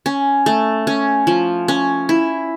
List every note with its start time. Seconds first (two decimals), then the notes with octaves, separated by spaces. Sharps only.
0.06 C#4
0.46 A3
0.87 C#4
1.27 F3
1.68 C#4
2.09 E4